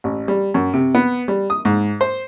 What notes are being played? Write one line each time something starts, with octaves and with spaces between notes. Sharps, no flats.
A1
G3
F#2
C3
B3
G3
D#6
G#2
C5